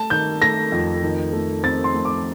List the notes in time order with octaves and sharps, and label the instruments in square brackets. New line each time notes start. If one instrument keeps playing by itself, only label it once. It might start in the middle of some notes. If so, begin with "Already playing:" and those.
Already playing: [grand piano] A3 [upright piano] A5
[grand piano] D#3 [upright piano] G6
[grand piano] A3 [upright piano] A#6
[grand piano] F2
D#3
A3
[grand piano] C4 [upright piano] A6
[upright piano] C6
[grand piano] A3
[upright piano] D6